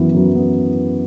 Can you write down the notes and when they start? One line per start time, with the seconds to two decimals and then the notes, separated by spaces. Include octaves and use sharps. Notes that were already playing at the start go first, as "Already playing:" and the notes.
Already playing: F#2 E3 B3 E4
0.15 F#2
0.35 B3